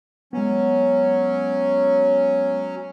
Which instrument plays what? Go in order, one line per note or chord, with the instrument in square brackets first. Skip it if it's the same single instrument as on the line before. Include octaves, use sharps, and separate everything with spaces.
[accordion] F#3 C#4 [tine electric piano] G#3 B3